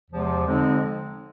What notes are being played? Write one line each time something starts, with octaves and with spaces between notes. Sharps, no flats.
E2 C3 F3 G#3
D3 F3 G#3 C4 D#4